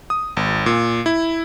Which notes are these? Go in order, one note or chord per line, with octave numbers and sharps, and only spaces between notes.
D#6
G#1
A#2
E4